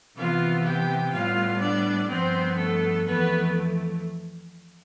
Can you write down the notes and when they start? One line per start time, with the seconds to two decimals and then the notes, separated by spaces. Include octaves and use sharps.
0.17 C3 E3 B3 F4 F5
0.65 G4 G5
1.13 A2 G3 B3 F4 F5
1.61 D4 D5
2.09 G2 F3 B3 C4 C5
2.58 A3 A4
3.06 F2 E3 A3 B3 B4